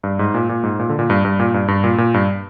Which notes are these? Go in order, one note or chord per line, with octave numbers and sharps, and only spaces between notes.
G2
G#2
A#2
A#2
G#2
A#2
D3
A#2
G2
G2
A#2
G2
G2
A#2
A#2
G2